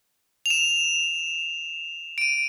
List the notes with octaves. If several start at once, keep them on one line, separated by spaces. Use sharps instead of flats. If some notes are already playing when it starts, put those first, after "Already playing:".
F7
E7
D7
D#7